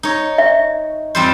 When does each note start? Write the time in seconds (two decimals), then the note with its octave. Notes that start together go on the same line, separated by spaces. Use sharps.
0.03 D#4 C#5
0.38 E5
1.15 F2 G3 C5